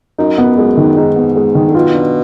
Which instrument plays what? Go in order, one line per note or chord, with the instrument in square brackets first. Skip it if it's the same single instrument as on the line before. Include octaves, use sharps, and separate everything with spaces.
[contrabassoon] F#2 [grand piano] D#4
[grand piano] B3
G#3
D#3
[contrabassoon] G#2 [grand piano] D#4
[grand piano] B3
G#3
D#3
[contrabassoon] D3
[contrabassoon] B2 [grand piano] F4
[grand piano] D4